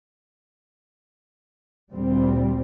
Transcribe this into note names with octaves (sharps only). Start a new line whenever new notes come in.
D2 A#2 G3 C4